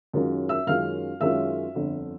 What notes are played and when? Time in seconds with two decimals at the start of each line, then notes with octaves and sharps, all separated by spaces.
0.13 F#2 D#3 G#3 C#4 F4
0.49 E5 E6
0.67 F#2 D#3 G#3 C#4 F4 F5 F6
1.21 F#2 D#3 G#3 C#4 F4 E5 E6
1.75 G1 F2 D3